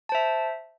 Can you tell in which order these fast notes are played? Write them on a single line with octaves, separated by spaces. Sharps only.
A5 C5 E5